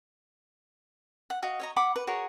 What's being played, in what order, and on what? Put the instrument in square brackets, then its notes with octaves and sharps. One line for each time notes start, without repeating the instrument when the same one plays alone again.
[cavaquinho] F#5
F#4 D#5 F5
C#5 D#5 A#5
F#5 B5 D6
B4
F#4 G#4 A#4 C#5